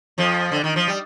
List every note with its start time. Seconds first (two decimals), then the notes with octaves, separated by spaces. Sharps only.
0.18 F2 F3
0.52 D3
0.64 D#3
0.76 F3
0.88 G3